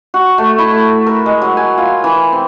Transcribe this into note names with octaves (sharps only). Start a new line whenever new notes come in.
F#4
A3
E4
A3
A#4
G#3
F#3
G#5
F4
E3
C4